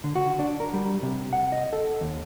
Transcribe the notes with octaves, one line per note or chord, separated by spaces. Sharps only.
D3
F#4
D4
A#4
G3
C3
F#5
D#5
A4
D#2